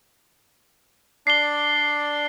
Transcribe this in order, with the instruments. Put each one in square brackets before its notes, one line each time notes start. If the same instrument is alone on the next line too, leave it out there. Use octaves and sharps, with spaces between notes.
[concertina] D4 D5 [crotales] C7 G7